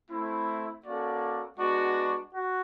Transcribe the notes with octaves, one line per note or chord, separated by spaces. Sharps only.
A3 C4 E4
A#3 C#4 F#4 A4 D5
G#3 B3 D4 F#4
F#4